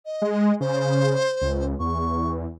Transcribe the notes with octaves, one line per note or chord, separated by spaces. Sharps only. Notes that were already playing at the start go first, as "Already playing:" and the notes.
D#5
G#3
C#3 C5
C#2
E2 C#6